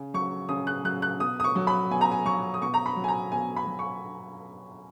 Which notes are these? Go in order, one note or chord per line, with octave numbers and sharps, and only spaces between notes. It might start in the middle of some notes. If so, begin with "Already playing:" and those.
Already playing: C#3
F#3 C#6
C#3 D#6
F#6
F#3 F#6
F#6
B2 D#6
D#6
C#6
F#3
B5
B2 G#5
A#5
G#5
F#3 C#6
D#6
B2 C#6
A#5
B5
F#3
G#5
A#5
B2 G#5
B5
F#3
C#6